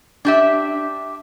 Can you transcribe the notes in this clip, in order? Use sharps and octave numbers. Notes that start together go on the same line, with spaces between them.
D4 G4 E5